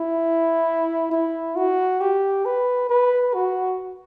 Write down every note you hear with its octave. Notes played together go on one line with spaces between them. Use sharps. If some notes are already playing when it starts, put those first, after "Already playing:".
Already playing: E4
E4
F#4
G4
B4
B4
F#4